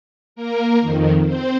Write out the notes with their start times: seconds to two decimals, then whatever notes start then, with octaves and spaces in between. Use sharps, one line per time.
0.36 A#3 A#4
0.81 F2 D#3
1.26 C4 C5